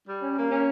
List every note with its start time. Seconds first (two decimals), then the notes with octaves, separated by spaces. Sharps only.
0.07 G3
0.22 C#4
0.36 A#3
0.51 C#4